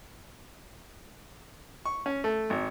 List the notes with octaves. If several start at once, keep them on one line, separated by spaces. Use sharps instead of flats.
C#6
C#4
A3
G#1